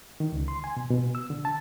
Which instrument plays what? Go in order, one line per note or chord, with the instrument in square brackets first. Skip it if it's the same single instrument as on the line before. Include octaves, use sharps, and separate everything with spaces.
[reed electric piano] D#3
C#2
C6
G#5
B2
B2
E6
D3
A5